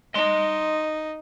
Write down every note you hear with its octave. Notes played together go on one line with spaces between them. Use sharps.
D#4 D#5 C6